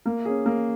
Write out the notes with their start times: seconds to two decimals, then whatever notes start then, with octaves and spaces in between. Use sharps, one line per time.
0.06 A#3
0.25 C#4 G#4
0.46 A#3